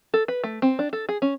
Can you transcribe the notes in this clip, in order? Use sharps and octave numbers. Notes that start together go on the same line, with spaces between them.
A4
B4
A3
C4
D4
A4
G#4
C#4